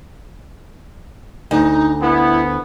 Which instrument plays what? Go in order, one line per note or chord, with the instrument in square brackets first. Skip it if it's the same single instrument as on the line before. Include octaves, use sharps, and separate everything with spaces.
[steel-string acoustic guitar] D2 [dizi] D#4
[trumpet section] B3 [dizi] E4